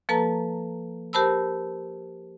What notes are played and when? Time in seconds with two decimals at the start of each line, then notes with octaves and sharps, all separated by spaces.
0.09 F3 A#3 A4 B4 A5 A#5
1.13 G4 A#4 C5 A5 B5 E6